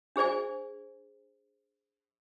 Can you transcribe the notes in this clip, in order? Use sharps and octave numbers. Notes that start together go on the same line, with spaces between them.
D4 G#4 C5 D5 G#5